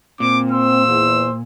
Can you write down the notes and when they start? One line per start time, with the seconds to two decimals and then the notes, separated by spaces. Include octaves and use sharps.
0.20 A#2 C4 D6
0.51 C5 E6
0.87 E2